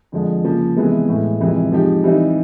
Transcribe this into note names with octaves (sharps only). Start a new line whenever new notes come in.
F2 D3 F3 G#3
C#3 F3 A#3
C3 E3 G#3 B3
A2 E3 G#3
F2 C3 E3 G#3
F3 G#3 C4 D#4 G4
E3 G3 C4 D#4